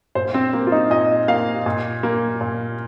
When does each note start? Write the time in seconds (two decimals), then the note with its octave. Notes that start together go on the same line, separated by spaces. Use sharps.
0.15 A#2 C5
0.34 C4
0.53 A#3
0.67 F4
0.72 D#4
0.90 A#2 D#5
1.28 A#3 F5
1.66 A#2
2.03 A#3
2.41 A#2